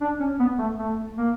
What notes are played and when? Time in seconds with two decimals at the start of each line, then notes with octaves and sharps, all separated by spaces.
0.01 D4
0.20 C#4
0.39 B3
0.58 A3
0.78 A3
1.17 A#3